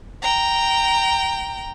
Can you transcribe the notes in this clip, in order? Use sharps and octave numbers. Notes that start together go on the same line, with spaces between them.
G5 A#5